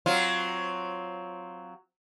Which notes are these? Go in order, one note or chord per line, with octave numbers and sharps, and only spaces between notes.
F#3 C4 F4